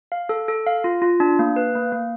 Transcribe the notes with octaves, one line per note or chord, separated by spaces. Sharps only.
F5
A4
A4
F5
F4
F4
D4
A#3
B4
A#3
A#3